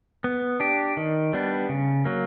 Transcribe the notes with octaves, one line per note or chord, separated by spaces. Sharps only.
B3
D4 G4
D#3
G3 B3 D4
C#3
F#3 A#3